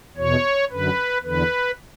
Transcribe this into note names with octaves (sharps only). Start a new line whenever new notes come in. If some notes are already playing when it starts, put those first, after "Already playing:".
E2 B2 C#5
F#2 D3 B4
E2 D3 B4